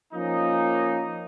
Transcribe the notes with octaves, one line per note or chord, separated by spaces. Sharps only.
F3 A#3 C#4 D#4